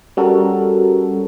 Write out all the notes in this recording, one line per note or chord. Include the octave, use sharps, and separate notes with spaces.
G3 C#4 F#4 A4 A#4